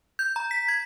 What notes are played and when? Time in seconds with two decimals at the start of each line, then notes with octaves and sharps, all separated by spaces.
0.19 G6
0.36 A#5
0.51 B6
0.68 G#6